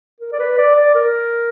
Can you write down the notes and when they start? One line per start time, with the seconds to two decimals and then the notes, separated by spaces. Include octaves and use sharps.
0.20 A#4
0.32 D5
0.39 B4
0.58 D5
0.76 D5
0.95 A#4